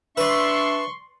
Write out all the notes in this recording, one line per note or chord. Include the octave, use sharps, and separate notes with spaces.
D4 B4 D5 E5 C6 C#6